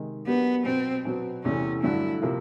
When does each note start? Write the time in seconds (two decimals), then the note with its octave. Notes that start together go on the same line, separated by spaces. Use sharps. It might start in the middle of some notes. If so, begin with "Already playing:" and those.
Already playing: C3 D#3 G#3
0.27 F#3 A#3 B3 D4 G4
0.66 B2 F#3 B3 C4
1.05 B2 F#3 B3
1.44 E2 C3 E3 A3 C#4
1.83 G2 D3 F#3 A3 E4
2.22 C3 F3 A#3